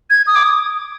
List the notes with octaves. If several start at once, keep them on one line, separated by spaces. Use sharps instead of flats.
G#6
D#6
D6
D#6